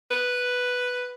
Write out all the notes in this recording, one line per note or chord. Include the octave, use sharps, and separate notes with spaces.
B4